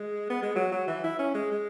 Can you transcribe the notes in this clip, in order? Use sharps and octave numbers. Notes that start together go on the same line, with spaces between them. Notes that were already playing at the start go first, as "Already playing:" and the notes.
Already playing: G#3
B3
G#3
F#3
F#3
E3
E4
C#4
G#3
G#3